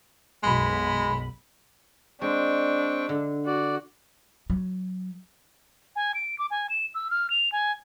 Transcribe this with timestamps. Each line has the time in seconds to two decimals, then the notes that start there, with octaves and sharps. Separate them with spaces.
0.43 B1 F#2 B2 G#3 B5
2.21 G#3 C4 D4 G5 C#6
3.09 D3
3.46 F#4 D5
4.50 F#3
5.96 G#5
6.14 D7
6.39 D6
6.51 G#5
6.70 E7
6.95 E6
7.11 F6
7.30 F7
7.52 G#5